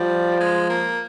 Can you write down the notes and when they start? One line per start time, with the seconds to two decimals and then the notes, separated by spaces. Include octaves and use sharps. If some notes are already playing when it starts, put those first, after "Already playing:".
Already playing: F3 G3
0.40 G#3
0.69 A#3